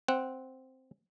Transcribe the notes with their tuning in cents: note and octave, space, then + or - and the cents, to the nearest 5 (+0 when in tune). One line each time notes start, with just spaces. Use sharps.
C4 +0 F#5 +0